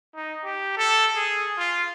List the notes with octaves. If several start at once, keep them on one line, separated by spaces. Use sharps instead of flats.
D#4
G4
A4
G#4
F4